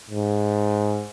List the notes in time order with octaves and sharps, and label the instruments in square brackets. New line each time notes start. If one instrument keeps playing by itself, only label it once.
[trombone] G#2